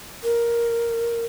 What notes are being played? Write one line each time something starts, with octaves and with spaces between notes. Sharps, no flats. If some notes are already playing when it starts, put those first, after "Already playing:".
A#4